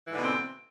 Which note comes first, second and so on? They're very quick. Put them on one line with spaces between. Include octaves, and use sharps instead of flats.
E3 G#2 D3 B2 C4